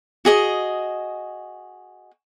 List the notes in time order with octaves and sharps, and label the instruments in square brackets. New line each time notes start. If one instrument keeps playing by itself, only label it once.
[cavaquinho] F#4 G#4 D#5